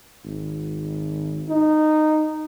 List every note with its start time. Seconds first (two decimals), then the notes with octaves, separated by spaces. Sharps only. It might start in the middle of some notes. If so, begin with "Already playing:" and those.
0.24 G#1
1.49 D#4